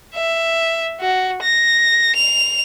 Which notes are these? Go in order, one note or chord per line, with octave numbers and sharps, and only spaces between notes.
E5
F#4
A#6
F7